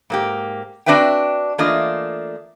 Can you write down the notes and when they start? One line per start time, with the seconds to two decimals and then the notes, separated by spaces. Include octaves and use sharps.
0.10 G#2 A#3 G4
0.86 C4 D4 F#4 B4 E5 G5
1.58 E3 A3 A#3 D4 F4 D#5